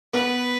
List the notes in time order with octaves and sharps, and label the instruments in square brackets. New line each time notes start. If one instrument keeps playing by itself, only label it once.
[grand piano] B3 [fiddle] B4